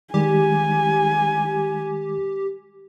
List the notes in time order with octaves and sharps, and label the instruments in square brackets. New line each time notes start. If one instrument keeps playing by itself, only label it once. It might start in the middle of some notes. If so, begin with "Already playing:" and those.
[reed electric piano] D#3 G3 G#3 [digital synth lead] G4 [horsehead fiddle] G#5